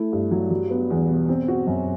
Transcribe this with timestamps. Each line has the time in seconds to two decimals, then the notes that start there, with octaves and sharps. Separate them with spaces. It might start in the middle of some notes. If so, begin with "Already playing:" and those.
Already playing: A3 E4
0.12 G2
0.31 F#3
0.50 F#3
0.70 B3
0.90 E2
1.08 B2
1.29 C4
1.48 F#4
1.67 F#2